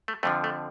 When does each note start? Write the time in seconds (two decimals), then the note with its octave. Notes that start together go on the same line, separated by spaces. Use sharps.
0.08 A3
0.23 F2 D3 F3 A3
0.44 A3